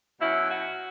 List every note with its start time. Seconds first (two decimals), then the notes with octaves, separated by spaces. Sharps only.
0.19 B2 F#3 C#4 E4
0.49 F#4